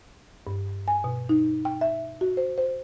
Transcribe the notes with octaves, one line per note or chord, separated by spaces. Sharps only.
G2
G#5
B2
D#4
G5
E5
F#4
C5
C5